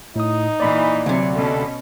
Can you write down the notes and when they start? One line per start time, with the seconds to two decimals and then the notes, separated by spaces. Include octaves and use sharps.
0.16 A2 D#4 D#6
0.60 A#2 E3 D5 B5
1.06 D2 C3 F#3
1.36 B2 C#4 A4